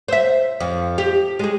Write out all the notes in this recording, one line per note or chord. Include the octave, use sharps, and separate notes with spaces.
C5 E5
F2
G4
G#3 G#4